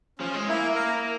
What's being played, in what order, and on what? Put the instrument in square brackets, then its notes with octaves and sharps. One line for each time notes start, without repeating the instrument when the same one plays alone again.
[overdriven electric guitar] F3 [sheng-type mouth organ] C#4
[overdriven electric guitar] G#3
[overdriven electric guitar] A#3 [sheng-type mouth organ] E4
[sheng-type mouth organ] A#4